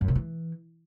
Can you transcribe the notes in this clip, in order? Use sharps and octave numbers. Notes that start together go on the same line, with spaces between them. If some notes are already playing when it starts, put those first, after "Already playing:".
F#2
C3
E3